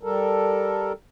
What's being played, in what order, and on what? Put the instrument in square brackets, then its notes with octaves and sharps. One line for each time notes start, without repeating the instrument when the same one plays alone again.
[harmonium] G3 A4 A#4